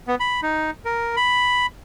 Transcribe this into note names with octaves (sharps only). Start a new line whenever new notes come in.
B3
B5
D#4
A#4
B5